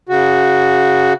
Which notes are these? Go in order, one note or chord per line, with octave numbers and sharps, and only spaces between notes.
C#3 F#4